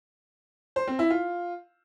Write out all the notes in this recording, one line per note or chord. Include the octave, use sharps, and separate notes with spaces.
C5
C4
E4
F4